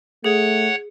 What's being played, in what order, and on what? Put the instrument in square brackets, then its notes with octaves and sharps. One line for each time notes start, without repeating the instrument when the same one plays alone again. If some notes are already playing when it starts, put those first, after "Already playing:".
[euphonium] A3 [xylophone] G#4 [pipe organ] C#5 F#5